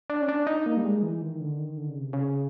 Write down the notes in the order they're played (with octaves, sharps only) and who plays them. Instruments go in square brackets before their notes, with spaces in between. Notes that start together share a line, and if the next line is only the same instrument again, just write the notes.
[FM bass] D4
C#4
D4
D#4
A#3
G3
G#3
E3
D#3
D3
D#3
D3
C#3
C3
C#3